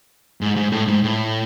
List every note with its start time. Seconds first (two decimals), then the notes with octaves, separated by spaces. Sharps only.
0.41 G#2
0.56 G#2
0.72 A2
0.88 G#2
1.04 A2